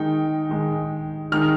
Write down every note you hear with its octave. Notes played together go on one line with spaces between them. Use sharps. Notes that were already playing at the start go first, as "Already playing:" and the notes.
Already playing: D#3 G#3 D#4 G5
D#3 G#3 D#4
D#3 G#3 D#4 F6